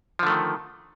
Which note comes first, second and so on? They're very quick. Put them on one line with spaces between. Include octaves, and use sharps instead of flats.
F3 D3 A3 D#3